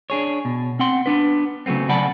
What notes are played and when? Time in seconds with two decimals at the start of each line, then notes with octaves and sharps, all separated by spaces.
0.10 D4 G#4 C#5
0.45 B2
0.79 C4 F#5 C6
1.06 B3 D4 B4
1.66 C#3 F#3 A3 B3 C4
1.89 C#3 D5 F#5 A5 B5